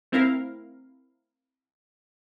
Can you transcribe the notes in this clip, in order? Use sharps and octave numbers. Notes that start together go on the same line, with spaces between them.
A3 C4 E4 A#4 F5